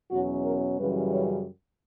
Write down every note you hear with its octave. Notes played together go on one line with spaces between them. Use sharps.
E2 B2 F#3 C#4 F#4
A#4
F#2 C#3 E3 G3 B4
C#5